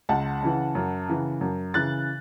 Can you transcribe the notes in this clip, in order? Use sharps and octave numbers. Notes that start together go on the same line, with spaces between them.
C#2 F#5 A5
C#3 E3
F#2
C#3 E3
F#2
C#3 E3 F#6 A6